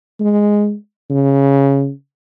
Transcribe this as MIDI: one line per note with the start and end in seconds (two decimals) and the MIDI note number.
0.20 0.75 56
1.10 1.91 49